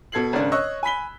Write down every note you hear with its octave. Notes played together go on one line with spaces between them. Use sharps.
B2 A4 G#6 C7 F#7
G#1 C#3 D4
C#5 D#5 C#6 E6 F#6
G#5 B5 B6 G7